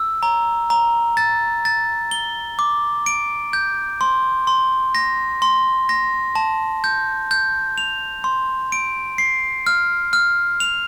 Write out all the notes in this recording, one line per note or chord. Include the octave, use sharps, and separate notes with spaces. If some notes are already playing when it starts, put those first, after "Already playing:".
Already playing: E6
A#5
A#5
A6
A6
G7
D6
D7
G6
C6
C6
A#6
C6
A#6
A5
G6
G6
F7
C6
D7
C7
F6
F6
F7